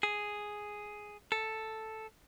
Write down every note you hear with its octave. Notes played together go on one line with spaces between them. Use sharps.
G#4
A4